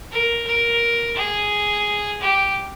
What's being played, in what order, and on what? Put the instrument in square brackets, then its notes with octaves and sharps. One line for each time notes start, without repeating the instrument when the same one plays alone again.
[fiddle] A#4
A#4
G#4
G4